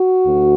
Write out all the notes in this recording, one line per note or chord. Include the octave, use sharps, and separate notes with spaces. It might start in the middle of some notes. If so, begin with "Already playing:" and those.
Already playing: F#4
D2